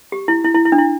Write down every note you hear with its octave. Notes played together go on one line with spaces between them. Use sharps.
G4
E4
E4
E4
E4
D4
E4